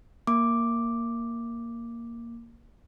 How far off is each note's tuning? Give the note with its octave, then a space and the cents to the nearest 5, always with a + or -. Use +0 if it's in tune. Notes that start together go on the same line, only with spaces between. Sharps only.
A#3 +0 D6 +0